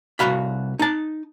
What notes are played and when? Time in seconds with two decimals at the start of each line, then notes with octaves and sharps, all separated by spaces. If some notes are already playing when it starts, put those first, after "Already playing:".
0.19 C2 C#3 F#4 F5 B5
0.79 D#4 A5